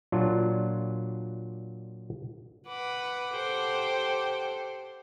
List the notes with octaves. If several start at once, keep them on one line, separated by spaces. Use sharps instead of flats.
A#2 F#3 D4 F4
B4 F#5 D6
G4 A4 C5